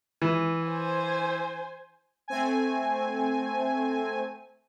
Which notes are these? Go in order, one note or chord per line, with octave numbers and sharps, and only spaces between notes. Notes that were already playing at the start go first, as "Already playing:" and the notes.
E3
C5 G#5
A3 C4 G#5